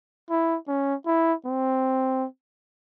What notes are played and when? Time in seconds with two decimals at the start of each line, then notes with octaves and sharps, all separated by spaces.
0.30 E4
0.68 C#4
1.07 E4
1.45 C4